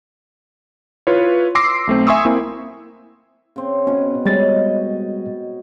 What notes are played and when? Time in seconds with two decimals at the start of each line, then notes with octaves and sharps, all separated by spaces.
1.07 E4 F4 B4 C#5
1.55 C6 D6 E6 A#6 C7
1.87 B1 A3 C4
2.07 E5 G#5 C6 C#6 D#6 E6
2.25 A#3 C4 E4
3.56 C#3 C4
3.87 B2 C#4 G#4 B4
4.25 G3 G#3 C#5 D#5 G5 A6